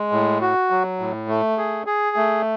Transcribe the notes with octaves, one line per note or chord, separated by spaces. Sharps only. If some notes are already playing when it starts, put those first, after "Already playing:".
Already playing: G#3
A2
F#4
F#3
A2
A3
G#4
G#4
A3